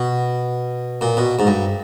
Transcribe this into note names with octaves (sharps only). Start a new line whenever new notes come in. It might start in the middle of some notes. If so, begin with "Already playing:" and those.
Already playing: B2
A#2
B2
G#2
G2